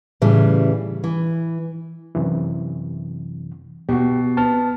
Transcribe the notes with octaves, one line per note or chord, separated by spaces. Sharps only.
A2 C#3 E3 G3
E3
F#2 C3 E3
B2 F#4 G4
B3 A5 F6